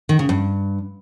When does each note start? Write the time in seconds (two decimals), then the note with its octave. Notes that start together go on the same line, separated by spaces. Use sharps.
0.09 D#3
0.19 C#3
0.29 G2